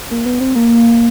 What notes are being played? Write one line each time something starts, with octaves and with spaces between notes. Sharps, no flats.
A#3
B3
C4
A#3